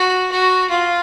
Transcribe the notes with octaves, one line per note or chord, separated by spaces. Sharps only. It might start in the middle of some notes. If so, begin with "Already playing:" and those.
Already playing: F#4
F#4
F4